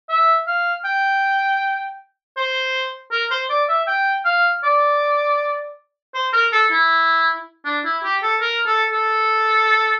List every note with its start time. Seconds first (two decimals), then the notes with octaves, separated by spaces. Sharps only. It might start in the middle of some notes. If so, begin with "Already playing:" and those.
0.09 E5
0.47 F5
0.85 G5
2.37 C5
3.12 A#4
3.31 C5
3.50 D5
3.69 E5
3.87 G5
4.25 F5
4.64 D5
6.14 C5
6.33 A#4
6.52 A4
6.71 E4
7.65 D4
7.85 E4
8.04 G4
8.23 A4
8.41 A#4
8.66 A4
8.92 A4